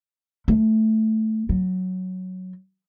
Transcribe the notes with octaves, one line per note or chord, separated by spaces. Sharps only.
A3
F#3